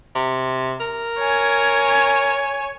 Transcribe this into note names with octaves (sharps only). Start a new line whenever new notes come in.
C3
A#4
C#5 G#5